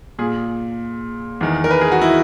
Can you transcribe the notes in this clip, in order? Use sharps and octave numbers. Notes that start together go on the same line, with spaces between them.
A#2 G#4
E2 D#3
A#4
B4
G#4
F#4
E4